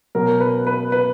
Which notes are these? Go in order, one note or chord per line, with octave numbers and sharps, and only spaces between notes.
B2 F#3 A#4
B4
B4
B4